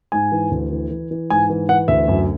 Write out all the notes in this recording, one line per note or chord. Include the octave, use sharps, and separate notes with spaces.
G#2 G#5
E3
D2
E3
E3
E3
G#2 G#5
E3
E3 F#5
D2 E5
F#2